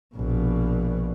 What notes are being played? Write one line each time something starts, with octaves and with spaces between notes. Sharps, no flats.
A#1 B2